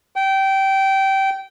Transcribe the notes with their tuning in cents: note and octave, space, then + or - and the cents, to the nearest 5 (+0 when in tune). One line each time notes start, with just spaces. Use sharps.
G5 -20